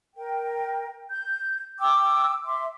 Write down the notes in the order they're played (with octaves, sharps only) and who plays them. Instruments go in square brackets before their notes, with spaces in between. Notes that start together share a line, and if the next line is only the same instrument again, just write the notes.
[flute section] A#4 G5
G6
G5 D6 E6
E5 C6 D6